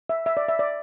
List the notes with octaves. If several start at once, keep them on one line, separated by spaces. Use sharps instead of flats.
E5
E5
D5
E5
D5